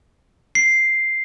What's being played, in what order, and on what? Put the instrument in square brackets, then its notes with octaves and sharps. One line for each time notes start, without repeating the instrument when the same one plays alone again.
[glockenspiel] C7